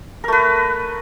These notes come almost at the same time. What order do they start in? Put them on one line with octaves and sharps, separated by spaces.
A#4 A3 B4